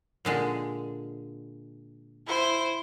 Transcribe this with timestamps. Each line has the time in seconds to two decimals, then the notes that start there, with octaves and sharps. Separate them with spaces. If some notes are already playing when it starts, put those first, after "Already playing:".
0.25 A#2 D3 G#3
2.27 E4 C5